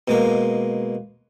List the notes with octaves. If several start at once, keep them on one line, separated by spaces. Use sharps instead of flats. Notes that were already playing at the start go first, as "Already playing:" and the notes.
B2 G#3 A#3